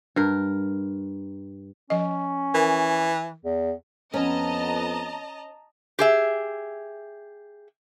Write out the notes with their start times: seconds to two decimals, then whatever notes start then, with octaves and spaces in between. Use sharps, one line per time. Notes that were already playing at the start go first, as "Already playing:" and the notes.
0.16 G2 A#4
1.90 F3 C#4 D#5
2.54 E3 A#4
3.45 E2
4.14 F2 B3 C#4 D#5 A5 A#5
5.99 G4 G#4 E5